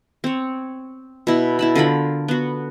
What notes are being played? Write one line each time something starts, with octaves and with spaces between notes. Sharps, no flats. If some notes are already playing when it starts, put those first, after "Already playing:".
C4 C#5
B2 E4
E4 A5 B5
D3 F4 A#4 B5
B3 F#4